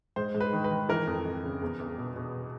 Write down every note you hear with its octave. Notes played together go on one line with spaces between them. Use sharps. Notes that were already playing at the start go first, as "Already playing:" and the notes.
G#2 C5
G#2
B4
D#3
B4
D#3
E3 A#4
F2
F2
C#3
E2
E2
B2
B2